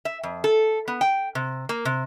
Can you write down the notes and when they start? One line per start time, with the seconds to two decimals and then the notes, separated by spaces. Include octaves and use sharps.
0.05 E5
0.24 F2
0.44 A4
0.88 B3
1.01 G5
1.35 C3
1.69 A#3
1.85 C3